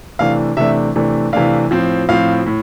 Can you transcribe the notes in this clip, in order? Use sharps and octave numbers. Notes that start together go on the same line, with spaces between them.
C3 E3 A3 D4 F5
C3 E3 A3 D4 E5
C3 E3 A3 D4
C3 E3 A3 D4 F5
A2 F3 C4
A2 F3 C4 F5
A2